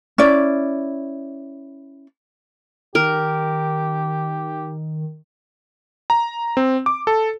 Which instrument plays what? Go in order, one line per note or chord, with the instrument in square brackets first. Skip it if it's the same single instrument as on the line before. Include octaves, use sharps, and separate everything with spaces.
[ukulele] C#4 E4 D5
[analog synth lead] D#3 [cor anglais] G4 [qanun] A#4
[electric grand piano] A#5
C4
D6
A4